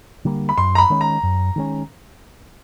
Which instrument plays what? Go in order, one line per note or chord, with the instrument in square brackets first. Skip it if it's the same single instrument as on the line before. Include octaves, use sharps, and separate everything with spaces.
[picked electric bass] D3 G3 A#3
[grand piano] B5
[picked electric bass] F#2 [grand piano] C6
[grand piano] A#5
B5
[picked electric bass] D#3 G#3 C#4
[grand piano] A#5
[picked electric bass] F#2
D#3 G#3 C#4